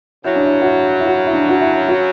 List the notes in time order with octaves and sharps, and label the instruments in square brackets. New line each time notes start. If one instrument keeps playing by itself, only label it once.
[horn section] F#2 C#3 F#3 [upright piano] E4
[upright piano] D4
E4
F#4
E4
E4
F#4
E4
D4
F#4
E4
F#4